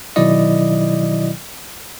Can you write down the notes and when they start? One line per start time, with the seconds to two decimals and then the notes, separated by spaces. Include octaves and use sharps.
0.16 B2 D#3 F#3 E4 D5 D#5